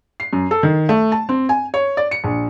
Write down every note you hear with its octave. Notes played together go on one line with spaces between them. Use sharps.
C7
F#2
A4
D#3
A3
A5
C4
G#5
C#5
D5
C#7
A#1